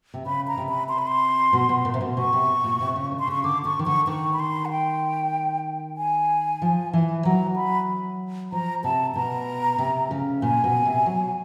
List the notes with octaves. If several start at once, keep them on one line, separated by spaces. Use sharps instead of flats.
C3
C#3 B5
A#5
C3
B5
C6
B5
C6
B2
B2
A#2
C3
B2
B2 C#6
C3
A#2
C3
C#3
D3
C6
C#3 C#6
D3 D6
D3 C#6
D#3
D3 C#6
D#3 C#6
B5
C6
F#5
G5
G#5
F3
E3
F#3 A#5
B5
F3 A#5
C3 A5
B2 A#5
C3
C#3
A#2 G#5
B2
C3
F#3